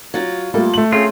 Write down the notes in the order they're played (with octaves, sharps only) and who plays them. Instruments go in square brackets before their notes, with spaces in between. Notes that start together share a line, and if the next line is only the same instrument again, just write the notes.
[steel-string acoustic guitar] F#3 F4
[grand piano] G3 A3 A#3 [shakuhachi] F4 [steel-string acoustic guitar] A4
[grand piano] A3 F#7
[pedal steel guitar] C4 F4 [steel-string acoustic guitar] C#4 [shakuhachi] G#4